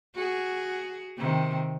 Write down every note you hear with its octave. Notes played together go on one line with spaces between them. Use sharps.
F#4 G#4
C3 D#3